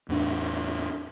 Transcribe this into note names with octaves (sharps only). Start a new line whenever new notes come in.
E2 A2 D4